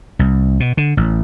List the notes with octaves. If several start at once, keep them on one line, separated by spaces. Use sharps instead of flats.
C2
B2
D3
A1